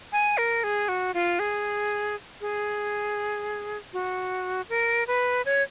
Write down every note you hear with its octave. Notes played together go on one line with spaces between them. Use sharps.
G#5
A#4
G#4
F#4
F4
G#4
G#4
F#4
A#4
B4
C#5